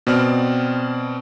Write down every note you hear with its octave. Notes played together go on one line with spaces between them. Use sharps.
B2 B3 C4 D5 F6